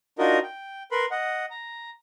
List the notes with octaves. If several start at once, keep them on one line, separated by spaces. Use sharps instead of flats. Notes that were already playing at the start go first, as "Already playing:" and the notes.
D4 D#4 F4 F#4 A#4 D#5
G5
A#4 B4 B5 C6
D#5 F#5
A#5